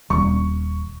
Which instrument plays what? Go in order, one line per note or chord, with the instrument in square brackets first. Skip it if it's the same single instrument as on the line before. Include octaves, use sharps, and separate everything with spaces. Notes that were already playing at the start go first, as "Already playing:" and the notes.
[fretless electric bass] D#1 [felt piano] C#6